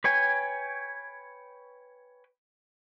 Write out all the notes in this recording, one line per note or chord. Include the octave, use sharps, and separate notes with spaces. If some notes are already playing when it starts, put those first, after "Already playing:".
B4 C#5 G5 G#5